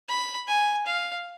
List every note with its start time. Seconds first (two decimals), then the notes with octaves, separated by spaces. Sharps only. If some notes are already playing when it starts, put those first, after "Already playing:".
0.09 B5
0.48 G#5
0.86 F5